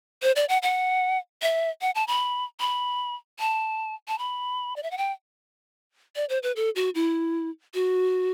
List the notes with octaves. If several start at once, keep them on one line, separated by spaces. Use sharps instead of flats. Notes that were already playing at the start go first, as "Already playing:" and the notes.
C5
D5
F#5
F#5
E5
F#5
A5
B5
B5
A5
A5
B5
D5
E5
F#5
G5
D5
C5
B4
A4
F#4
E4
F#4